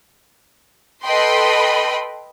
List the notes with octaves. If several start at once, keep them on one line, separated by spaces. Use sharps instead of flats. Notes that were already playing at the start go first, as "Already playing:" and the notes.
A4 B4 D#5 G5 B5 C6